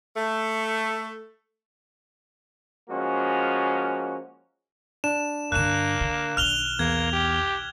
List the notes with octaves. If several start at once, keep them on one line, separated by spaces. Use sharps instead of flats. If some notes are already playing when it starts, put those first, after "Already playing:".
A3
F3 G#3 A#3 C#4 F#4
D4 E7
G2 D3 A#3 F#6 E7
D3
B1 D#3 F6 F7 G7
E2 A#3 G#6
G4